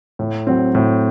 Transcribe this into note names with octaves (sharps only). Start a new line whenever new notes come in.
A2
F#3 C4
A2